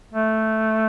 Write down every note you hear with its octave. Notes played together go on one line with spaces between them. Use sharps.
A3